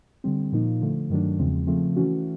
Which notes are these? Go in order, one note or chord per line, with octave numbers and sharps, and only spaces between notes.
D3 G3 C4
A#2 F3 A#3 D#4
D3 F3 A3
G2 D#3 F#3 A3 D4
E2 C#3 F3 G#3 C4
C#3 F3 A3 C4
E3 A3 C#4 F#4